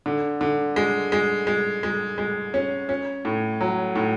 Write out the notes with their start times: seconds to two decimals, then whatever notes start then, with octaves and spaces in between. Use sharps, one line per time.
0.06 D3
0.41 D3
0.76 G#3
1.12 G#3
1.47 G#3
1.83 G#3
2.18 G#3
2.54 C#4
2.89 C#4
3.25 A2
3.61 F#3
3.95 A2